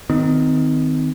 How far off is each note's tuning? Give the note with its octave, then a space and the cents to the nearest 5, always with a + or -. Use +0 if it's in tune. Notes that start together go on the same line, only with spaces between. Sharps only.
D#3 +0 C4 -35